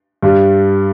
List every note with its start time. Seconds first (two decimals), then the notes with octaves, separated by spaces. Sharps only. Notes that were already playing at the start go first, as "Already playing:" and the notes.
0.22 G2 G3